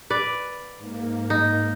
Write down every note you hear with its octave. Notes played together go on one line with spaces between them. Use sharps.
B4 D5
G#2 A#3
D#4